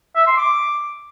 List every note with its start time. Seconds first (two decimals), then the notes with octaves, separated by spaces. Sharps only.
0.16 E5
0.27 C6
0.38 D6